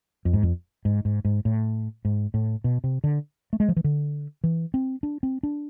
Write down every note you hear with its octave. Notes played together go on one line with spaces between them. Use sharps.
F2
G#2
F2
G#2
G#2
G#2
A2
G#2
A2
B2
C3
D3
A3
G#3
F3
E3
D3
E3
C4
D4
C4
D4